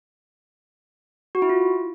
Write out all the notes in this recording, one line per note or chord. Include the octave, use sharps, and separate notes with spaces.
F#4
E4
F4